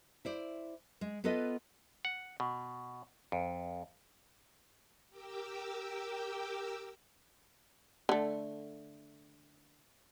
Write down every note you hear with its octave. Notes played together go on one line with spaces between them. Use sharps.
E4 C5 D5
G#3
B3 F4 A4 B4 D#5
F#5
B2
F2
G4 A#4 G5 D6 E6
D3 A3